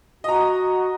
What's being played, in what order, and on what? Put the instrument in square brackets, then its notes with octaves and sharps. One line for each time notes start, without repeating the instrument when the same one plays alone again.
[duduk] F#4 [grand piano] D#5 A#5